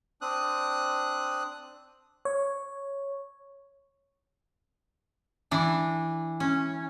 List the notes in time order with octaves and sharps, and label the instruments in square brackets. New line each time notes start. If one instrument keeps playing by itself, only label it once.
[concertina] C4 D4 D#6 F#6
[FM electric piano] C#5
[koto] E3 D4
C#4